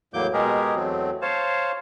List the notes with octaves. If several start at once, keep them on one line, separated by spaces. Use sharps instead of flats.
E2 A2 F#3 A#3 D6 G6
B2 G#3 G4 G#4 A#4
E2 F#3 A3 C4
C5 C#5 F5 A5